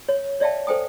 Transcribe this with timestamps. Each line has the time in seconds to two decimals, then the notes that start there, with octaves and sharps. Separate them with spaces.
0.09 C#5
0.40 C#5 D5 E5 F5 G5 A5
0.67 A4 C5 G5 G#5 D#6